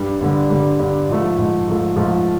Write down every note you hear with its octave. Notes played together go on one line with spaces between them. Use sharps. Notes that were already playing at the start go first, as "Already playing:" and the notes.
Already playing: G2 G3
G2 D3 G3
G2 D3 G3
G2 D3 G3
G#2 F3 A3
G#2 F3 A3
G#2 F3 A3
G#2 F3 A3